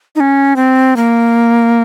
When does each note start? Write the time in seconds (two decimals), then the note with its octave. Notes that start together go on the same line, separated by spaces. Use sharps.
0.16 D#4
0.20 C#4
0.56 C4
0.96 A#3